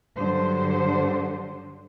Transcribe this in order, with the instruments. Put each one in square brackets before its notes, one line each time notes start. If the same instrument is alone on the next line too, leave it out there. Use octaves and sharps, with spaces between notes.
[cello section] G2 D3 F#3 C5